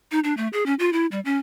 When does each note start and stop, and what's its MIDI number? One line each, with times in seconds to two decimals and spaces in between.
0.11 0.20 63
0.24 0.35 62
0.37 0.48 57
0.53 0.65 68
0.66 0.74 61
0.79 0.92 65
0.93 1.06 64
1.12 1.20 55
1.25 1.38 61